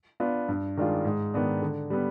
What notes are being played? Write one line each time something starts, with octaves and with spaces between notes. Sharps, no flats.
B3 D4 F4
G2
D#3 G#3 D4 F4
G#2
D#3 B3 D4
D3
G3 B3